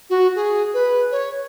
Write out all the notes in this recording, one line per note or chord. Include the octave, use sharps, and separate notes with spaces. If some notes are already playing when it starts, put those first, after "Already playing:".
F#4
G#4
B4
C#5